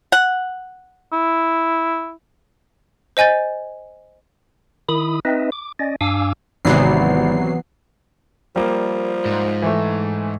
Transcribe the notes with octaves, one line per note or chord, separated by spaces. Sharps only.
F#5
E4
C5 D#5 G#5 G6 A6
D#3 E4 B5 D#6
C4 D#4 B4 D#5 E5
D6
C#4 D5 D#5
G2 D4 F5 G#5 D6 E6
G#1 C3 E3 F#3 B3 C7
F3 G3 A#3
G#2
E3 A3